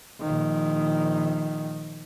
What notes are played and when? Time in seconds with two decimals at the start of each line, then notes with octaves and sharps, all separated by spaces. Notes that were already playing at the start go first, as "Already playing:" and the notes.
0.21 A#1 D#3